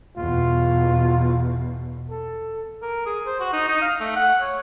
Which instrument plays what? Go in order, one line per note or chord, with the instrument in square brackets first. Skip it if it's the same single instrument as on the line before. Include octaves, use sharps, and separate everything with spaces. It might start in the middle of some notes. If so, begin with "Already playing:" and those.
[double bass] E2 B2 [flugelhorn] F4
[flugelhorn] A4
[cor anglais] A#4
G#4
C5
F#4
D#4
D#4
F5
A3
F#5
C#5